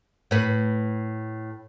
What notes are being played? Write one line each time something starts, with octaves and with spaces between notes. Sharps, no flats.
A2 B4